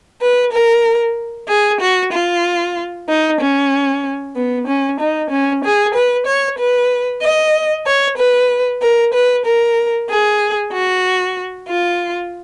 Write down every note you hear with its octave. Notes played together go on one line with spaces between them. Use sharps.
B4
A#4
G#4
F#4
F4
D#4
C#4
B3
C#4
D#4
C#4
G#4
B4
C#5
B4
D#5
C#5
B4
A#4
B4
A#4
G#4
F#4
F4